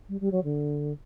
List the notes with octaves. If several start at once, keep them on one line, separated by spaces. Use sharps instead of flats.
G3
G3
F#3
D3